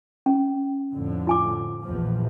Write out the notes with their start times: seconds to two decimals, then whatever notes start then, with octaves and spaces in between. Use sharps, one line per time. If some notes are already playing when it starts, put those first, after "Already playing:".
0.26 C#4
0.94 F2 A2 D3
1.27 F4 G#5 D6
1.84 A#1 E2 F3